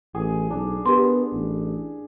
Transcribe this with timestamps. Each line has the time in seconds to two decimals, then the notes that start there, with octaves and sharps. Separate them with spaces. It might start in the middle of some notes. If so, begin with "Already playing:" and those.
0.15 A1 G#4
0.50 B1 D4
0.86 B3 G4 A#4 C6
1.33 A1